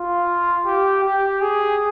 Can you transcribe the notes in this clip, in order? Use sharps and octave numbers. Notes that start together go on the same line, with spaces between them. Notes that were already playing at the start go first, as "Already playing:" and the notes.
Already playing: F4
G4
G4
G#4